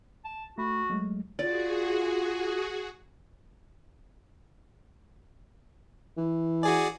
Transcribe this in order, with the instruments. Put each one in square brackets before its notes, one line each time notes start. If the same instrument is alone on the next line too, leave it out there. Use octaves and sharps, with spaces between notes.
[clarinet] A5
[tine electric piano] A3 B5 [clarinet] F#4
[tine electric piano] F#3 G#3 A3
[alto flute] F4 [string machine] F#4 G#4 [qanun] D5
[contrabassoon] E3
[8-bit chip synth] F#4 G#4 D5 [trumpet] G#5